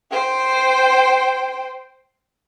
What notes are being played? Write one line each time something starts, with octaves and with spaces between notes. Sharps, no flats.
C5 G5